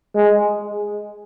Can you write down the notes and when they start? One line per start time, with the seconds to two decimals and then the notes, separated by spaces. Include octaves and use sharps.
0.15 G#3